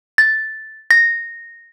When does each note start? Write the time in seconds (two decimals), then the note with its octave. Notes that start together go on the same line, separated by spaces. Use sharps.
0.18 A6
0.91 A#6